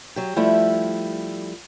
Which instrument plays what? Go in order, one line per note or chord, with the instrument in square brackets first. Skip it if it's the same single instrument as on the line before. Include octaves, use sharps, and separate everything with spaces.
[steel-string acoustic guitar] F#3 G4
F3 G3 A3 E4